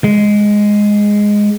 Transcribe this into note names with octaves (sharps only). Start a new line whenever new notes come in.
G#3